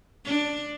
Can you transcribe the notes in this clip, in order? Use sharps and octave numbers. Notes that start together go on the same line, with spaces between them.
D4